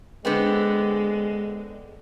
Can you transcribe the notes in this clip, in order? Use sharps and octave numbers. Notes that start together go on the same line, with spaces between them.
D3 G#3 B3 C4